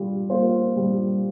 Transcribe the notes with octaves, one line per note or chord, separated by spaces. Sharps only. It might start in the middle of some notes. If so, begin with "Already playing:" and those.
Already playing: G3 F4
A#3 F4 C5
G3